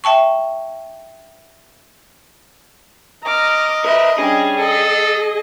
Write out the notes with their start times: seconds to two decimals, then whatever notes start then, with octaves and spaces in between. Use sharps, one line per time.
0.04 E5 G5 A5 C#6
3.24 D#5 A#5 D6 F6
3.85 A#4 B4 E5
4.18 G3 C#4 D4 G#4
4.59 A4 D#5